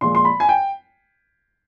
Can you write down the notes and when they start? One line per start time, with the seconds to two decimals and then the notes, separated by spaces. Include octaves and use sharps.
0.01 A#2 F3 G#3 C6
0.15 C6
0.25 B5
0.40 G#5
0.49 G5